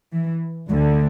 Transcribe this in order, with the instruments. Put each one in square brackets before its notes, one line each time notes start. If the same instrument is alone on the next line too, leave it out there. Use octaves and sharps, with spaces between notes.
[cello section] E3
D2 D3 F#3